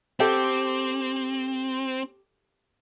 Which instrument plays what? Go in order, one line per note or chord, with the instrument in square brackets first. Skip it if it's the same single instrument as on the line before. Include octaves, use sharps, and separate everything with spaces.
[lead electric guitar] C4 [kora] G4 A4 G5